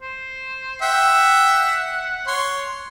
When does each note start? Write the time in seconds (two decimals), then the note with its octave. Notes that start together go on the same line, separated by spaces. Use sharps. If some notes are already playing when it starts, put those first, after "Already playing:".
0.02 C5
0.82 E5 F#5 G5
2.27 C#5 C6